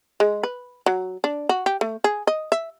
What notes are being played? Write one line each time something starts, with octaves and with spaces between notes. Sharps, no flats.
G#3
B4
F#3
D4
F#4
G4
A3
G#4
D#5
E5